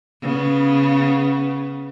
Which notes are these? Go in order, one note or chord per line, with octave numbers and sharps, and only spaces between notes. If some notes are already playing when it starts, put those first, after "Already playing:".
C#3 B3